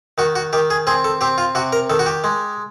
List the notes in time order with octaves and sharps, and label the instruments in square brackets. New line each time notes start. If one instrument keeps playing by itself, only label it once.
[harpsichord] D#3 F#4
F#4
D#3 G4
G#4
C4 G#4
A4
C4 G4
F4
C3 F#4
A#4
D#3 A4
F#4
G4
G#3